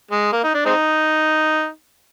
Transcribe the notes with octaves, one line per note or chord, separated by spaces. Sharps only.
G#3
A#3
D#4
D4
G#3 C4 D#4